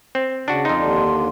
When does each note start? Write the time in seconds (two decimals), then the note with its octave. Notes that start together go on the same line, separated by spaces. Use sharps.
0.15 C4
0.48 C#3 D4 F#4
0.65 F2 D#4 C6
0.78 D#2 D3 D4